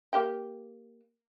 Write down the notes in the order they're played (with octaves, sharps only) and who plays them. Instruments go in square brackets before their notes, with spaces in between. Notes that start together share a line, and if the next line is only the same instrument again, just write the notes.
[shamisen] A#3 G4 G5